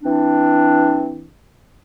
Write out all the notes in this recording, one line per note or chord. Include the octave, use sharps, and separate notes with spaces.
E3 C4 D4